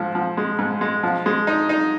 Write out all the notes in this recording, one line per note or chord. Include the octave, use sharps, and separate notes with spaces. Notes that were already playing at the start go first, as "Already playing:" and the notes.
Already playing: G#2 F3
F3
G#3
G#2
G#3
F3
G#3
D#4
D#4